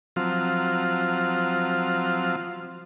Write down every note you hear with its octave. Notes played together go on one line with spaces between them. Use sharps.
F3 F#3 C4 F4